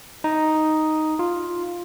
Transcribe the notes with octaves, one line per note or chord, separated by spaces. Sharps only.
D#4
F4